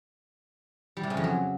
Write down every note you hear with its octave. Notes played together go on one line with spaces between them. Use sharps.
G3
C3
C#3
F2
F#3